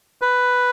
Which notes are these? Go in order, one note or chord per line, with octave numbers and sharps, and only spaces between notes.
B4